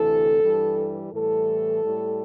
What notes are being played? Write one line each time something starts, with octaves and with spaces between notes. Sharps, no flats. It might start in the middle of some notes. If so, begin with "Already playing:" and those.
Already playing: D2 C3 E3 A4
G2 E3 G3
A2 E3 G3 A4
A2 G3